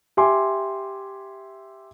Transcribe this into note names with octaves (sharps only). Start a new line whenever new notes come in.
G4 E5 G#5 C6 D6